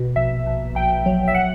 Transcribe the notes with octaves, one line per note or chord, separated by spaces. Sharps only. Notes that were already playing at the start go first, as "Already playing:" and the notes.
Already playing: B2
A#1 E5
A#1
A#1 G5
F#3
E5
F#5